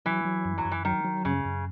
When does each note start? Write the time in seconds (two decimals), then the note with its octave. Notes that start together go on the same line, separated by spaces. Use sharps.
0.06 E3 F#3
0.25 F#3
0.45 F#2
0.58 F#3
0.65 F#2
0.71 E3
0.85 D#3 F#3
1.05 F#3
1.25 F#2 C#3
1.45 F#2